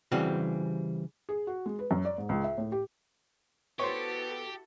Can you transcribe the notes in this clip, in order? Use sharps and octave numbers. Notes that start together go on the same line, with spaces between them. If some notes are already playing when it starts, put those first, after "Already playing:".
C#3 E3 G3 C4 F#4 G4
G#4
F#4
G#3
B4
F#2
D5
G#2
C#2
E5
A2
G4
B3 E4 F#4 G4 A4 C5 C#5